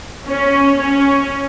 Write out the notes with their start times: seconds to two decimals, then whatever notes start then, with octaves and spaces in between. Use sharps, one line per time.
0.29 C#4
0.79 C#4